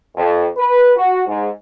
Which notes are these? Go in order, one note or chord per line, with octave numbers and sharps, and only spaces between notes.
F2
B4
F#4
G#2